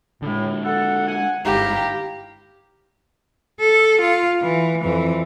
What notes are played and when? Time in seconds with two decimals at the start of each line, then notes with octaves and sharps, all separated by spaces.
0.22 A2 D3 G#3
0.65 A4 F#5
1.06 F#5 G#5
1.45 G1 G#2 E4 G4 F5 A#5
3.60 A4
4.02 F4
4.42 E3
4.84 F2 E3